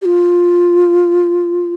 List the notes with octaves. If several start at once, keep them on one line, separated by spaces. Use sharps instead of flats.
G4
F4